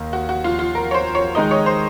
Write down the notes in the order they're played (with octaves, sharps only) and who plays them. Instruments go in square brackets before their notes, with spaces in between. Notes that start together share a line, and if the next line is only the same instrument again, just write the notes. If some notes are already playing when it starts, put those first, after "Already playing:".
Already playing: [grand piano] D#2 D#3 A#3
[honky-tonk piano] F#4
F#4
F4
F4
A#4
C#5
C5
C#5
[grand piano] D#3 G#3 D#4 A#4 [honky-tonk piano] D#5
[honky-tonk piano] C#5
C5